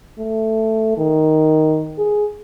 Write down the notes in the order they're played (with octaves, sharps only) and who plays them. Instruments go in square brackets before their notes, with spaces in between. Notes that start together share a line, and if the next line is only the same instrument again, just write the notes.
[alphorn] A3
D#3
G#4